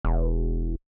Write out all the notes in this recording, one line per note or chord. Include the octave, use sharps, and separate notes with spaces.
E1